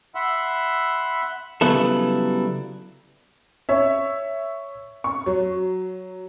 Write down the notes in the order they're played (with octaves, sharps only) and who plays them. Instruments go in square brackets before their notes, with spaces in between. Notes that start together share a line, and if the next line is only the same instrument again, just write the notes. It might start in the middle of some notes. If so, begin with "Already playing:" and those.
[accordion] E5 F#5 B5 C6 E6
[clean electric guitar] C#3 F#3 G3 B3 E4 A4
[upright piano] C#5 E5
C#6
F#3